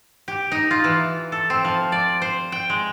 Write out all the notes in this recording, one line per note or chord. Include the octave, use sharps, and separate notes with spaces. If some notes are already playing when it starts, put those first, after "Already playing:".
G4
D#4
F4
E3
A4
C4
F3
D5
C5
G5
G#3